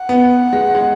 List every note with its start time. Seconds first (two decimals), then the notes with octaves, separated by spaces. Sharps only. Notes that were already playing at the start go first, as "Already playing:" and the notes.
Already playing: F#5
0.09 B3
0.53 G#3
0.75 G#3